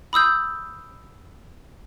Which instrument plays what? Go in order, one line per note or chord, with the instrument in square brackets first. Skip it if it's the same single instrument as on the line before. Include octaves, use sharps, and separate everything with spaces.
[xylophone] B5 D#6 E6 G6